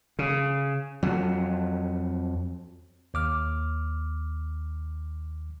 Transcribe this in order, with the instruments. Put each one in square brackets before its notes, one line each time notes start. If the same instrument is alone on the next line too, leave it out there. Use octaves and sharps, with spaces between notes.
[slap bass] C#3
F2 F#3
[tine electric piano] D#2 D6 F6